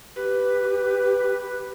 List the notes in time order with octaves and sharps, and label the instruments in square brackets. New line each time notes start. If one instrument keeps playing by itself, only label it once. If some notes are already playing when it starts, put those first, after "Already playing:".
[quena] G4 [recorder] B4